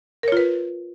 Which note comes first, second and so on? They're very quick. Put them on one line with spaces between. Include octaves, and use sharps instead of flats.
A#4 C#5 F4 B4